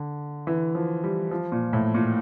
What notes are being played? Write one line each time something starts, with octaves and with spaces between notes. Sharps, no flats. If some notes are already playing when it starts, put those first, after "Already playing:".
Already playing: D3
E3
F3
G3
F3
A#2
A2
A#2